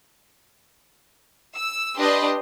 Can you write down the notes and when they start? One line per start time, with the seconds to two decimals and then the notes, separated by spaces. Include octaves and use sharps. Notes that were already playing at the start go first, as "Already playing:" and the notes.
1.57 E6
1.97 D4 G4 B4 D#5 C6